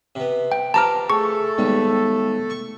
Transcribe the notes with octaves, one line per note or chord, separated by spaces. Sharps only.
C3 B3
G5
F3 G4 B4 A5 A#5 D6 F6
A3 G#4 A4 C#6
D#2 G3 G#3 B3 D#4
C#6